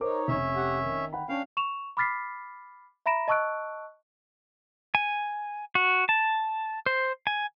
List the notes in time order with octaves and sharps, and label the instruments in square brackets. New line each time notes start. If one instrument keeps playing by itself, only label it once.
[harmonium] D#4 C#5 [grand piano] A#4 C5 D6
[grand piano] F1 [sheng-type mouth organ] C#4 E5
[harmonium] G4 F#5
D#3
[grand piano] F#5 G5 B5
[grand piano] C#4 [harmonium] D4 C#5 G5 [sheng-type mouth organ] F5
[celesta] C#6 E7 F7
B5 D6 F6 A6 B6 C7
E5 A#5 B5 A#6 D7 E7
D#5 A5 C#6 E6 F#6 D7
[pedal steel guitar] G#5
F#4
A5
C5
G#5